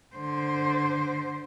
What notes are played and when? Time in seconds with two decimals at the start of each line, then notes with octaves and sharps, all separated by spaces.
0.16 D3 C5